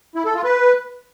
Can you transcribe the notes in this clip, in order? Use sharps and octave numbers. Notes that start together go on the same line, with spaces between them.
E4
A4
F4
B4